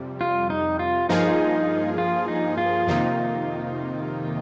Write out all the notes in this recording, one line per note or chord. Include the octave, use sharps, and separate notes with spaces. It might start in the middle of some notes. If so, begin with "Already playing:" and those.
Already playing: F2 C3 G3
F4
D#4
F4
G2 F3 A#3 D#4 F4 G#4
F4
D#4
F4
F2 C3 D#3 A#3 D#4